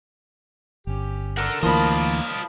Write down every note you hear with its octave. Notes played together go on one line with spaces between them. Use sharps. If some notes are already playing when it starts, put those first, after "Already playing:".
G1 C#4 G4
A4 A#4 D5 F#5
D2 E3 F3 A#3 F4 D#5 B5